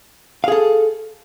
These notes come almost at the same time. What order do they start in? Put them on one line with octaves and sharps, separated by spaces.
F5 G#4 A4